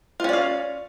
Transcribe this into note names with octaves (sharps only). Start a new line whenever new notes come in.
C#4 F4 D5 F5